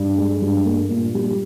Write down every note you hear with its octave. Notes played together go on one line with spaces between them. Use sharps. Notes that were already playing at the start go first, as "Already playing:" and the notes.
Already playing: G2
G#3
G2
A#3
A#2
G3